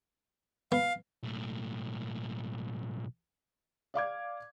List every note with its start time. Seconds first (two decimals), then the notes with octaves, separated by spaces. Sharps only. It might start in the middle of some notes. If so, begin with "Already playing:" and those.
0.72 B3 F5
1.23 B1 A2
3.94 D5 F5 D6 G#6